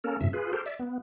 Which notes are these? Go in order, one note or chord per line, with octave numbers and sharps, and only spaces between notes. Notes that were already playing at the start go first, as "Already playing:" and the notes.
A#3 C#4 A4 A#4
F#2 A2 C3 E5
F4 G#4 B4
G4 A4 A#4 C5
D5 E5
B3